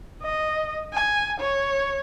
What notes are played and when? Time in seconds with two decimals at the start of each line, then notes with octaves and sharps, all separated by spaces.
0.23 D#5
0.93 G#5
1.40 C#5